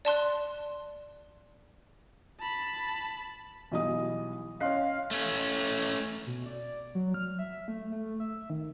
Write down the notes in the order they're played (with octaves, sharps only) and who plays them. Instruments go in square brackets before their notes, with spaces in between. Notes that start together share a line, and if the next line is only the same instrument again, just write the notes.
[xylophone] D5 A5 C6 F#6
[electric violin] A5 B5
[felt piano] B1 D#5 D#6 [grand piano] E3 G3
[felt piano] C#4 D#5 F#6 [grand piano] C#5 C6 C7 [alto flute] F5
[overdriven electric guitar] A3 C#4
[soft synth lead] B2
D5
F#3
F6
E5
A3
A3
E5
D#3